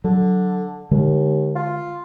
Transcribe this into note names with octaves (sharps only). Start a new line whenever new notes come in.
D3 F#3
D#2 D3 G#3
F4